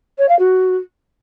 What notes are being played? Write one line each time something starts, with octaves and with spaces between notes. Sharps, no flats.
C#5
F5
F#4